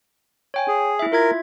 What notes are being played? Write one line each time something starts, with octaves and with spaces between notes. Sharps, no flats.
C#5 G5 G#5
G#4
E4 E5
F4 A#4 E5 G#6